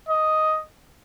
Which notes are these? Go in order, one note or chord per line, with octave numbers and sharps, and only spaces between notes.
D#5